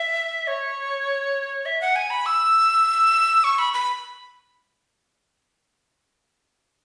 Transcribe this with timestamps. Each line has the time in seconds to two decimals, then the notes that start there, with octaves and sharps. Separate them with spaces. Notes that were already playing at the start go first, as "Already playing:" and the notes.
Already playing: E5
0.47 C#5
1.66 E5
1.81 F#5
1.96 G#5
2.10 B5
2.26 E6
3.44 C#6
3.59 B5
3.73 B5